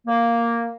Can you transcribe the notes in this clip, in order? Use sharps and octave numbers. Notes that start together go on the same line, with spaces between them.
A#3